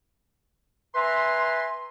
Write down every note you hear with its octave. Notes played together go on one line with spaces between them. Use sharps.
B4 E5 G#5 A#5 C6